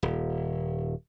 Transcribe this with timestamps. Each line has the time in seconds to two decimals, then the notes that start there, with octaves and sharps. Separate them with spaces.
0.03 D#1